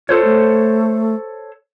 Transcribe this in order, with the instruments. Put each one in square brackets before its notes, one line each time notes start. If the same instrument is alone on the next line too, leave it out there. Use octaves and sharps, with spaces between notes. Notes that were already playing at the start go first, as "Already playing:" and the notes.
[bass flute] F4 [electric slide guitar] A4 C5 C#5
[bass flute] A3